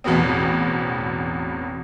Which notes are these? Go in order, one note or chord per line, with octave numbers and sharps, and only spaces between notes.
A1 E2 B2 B3 C4